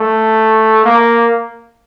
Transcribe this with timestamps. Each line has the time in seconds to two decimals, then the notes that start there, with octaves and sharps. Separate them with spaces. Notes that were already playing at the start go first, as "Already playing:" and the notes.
Already playing: A3
0.84 A#3